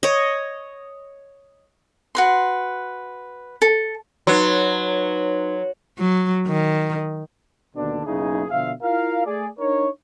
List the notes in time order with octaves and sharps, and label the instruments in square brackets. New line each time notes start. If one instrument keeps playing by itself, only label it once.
[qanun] C#5 D#5
[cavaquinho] F#4 B4 C6
A4
[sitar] F#3 [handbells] D#4 B4 C6
[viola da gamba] F#3
D#3
[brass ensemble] D#2 B2 D3 D4
F#1 B1 C#3 D#4 E4 G#4
B2 D3 F3 E5 F5
E4 F4 A#4 F5
A3 G#4 D5
D4 D#4 A#4 C#5